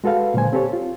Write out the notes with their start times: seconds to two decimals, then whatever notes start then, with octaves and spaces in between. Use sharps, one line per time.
0.04 G#3 F#4 A4 B4 F5
0.34 A#2 D3 F#3 C5 G#5
0.53 C4 G4 A4 C#5
0.73 F4